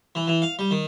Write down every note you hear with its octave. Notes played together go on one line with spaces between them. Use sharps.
E3
E3
F5
G3
D#3